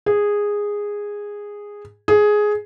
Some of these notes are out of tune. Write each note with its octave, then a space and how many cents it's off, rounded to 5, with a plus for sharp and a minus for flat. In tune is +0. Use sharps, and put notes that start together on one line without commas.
G#4 -10
G#4 +10